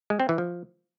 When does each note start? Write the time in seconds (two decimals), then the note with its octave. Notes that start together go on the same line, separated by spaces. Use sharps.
0.10 G#3
0.20 C4
0.29 E3
0.38 F3